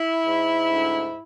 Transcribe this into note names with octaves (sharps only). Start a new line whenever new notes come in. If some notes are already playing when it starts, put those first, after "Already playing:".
Already playing: E4
G#2
D2